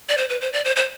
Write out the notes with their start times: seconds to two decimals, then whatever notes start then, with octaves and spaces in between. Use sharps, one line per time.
0.09 D5
0.17 C5
0.29 B4
0.41 C5
0.53 D5
0.65 C5
0.76 C5